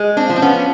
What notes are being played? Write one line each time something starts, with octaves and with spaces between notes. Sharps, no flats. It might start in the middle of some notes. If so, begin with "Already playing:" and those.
Already playing: G#3
C4 D4
F3
C4
B3 C#4